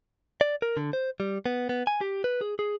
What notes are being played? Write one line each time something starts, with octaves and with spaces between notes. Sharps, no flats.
D5
A#4
D3
C5
G3
B3
B3
G#5
G4
B4
G#4
G#4